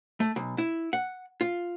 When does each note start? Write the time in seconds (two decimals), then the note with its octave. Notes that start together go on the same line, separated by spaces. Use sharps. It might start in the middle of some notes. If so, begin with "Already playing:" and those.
0.20 A3
0.36 B1
0.58 E4
0.93 F#5
1.41 F4